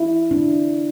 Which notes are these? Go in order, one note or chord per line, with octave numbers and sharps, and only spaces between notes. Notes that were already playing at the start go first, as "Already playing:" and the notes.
Already playing: E4
D4